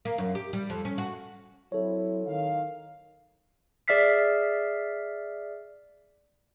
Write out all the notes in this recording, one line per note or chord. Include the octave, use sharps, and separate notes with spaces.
A#3
F#2
G4
G3
F2
C#4
F#4
F#3 C4 E4 A4 C#5
D#3 F5
G#4 D5 E5 F6 B6 C7